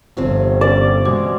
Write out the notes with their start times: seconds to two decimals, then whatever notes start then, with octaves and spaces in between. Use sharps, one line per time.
0.17 G1 C3 F3 C4
0.61 C#4 D5
1.05 B2 E3 G#3 F#4 D6